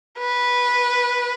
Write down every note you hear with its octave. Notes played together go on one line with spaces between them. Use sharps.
B4